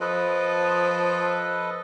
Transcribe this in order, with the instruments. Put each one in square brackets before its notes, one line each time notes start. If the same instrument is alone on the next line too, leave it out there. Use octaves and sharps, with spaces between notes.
[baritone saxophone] F3 [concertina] A4 B4 D#5